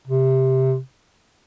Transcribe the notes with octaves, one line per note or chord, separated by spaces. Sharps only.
C3